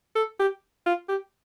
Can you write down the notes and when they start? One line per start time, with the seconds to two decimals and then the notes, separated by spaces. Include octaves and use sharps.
0.15 A4
0.39 G4
0.86 F4
1.09 G4